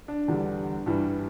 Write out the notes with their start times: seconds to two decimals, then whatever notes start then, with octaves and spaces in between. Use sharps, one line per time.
0.08 D4
0.28 E2 D3 G3
0.86 G2 E3 G3